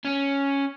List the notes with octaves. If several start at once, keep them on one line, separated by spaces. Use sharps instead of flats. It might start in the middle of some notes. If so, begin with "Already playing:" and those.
C#4